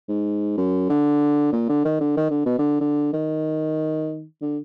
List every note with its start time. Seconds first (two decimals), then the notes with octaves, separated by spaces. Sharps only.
0.09 G#2
0.57 F#2
0.89 D3
1.53 A#2
1.69 D3
1.85 D#3
2.01 D3
2.17 D#3
2.31 D3
2.46 B2
2.59 D3
2.81 D3
3.13 D#3
4.41 D3